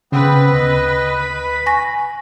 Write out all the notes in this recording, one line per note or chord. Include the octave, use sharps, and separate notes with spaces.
C#3 B3 C4 B4
D2 D#5
B5
G#5 C#6 A#6